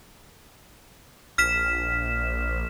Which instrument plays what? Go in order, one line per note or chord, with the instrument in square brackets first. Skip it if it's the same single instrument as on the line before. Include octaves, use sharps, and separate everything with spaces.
[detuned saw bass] A#1 [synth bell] F6 B6 E7